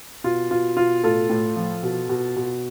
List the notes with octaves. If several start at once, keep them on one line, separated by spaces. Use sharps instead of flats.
B2 F4
B2 F4
B2 F4
A2 F4 A4
A2
F3
B2
B2
B2